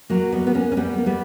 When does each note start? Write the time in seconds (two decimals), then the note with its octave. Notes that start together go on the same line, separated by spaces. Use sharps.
0.10 F#3 A#3
0.32 G3 B3
0.47 B3
0.54 A#3 C#4
0.72 C#4
0.77 G3 B3
0.98 A#3
1.06 G3 B3